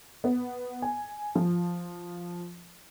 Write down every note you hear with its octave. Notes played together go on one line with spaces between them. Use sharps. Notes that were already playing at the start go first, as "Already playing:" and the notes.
B3
G#5
F3